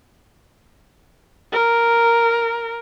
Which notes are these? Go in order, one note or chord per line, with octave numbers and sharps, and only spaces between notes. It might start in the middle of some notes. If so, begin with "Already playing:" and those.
A#4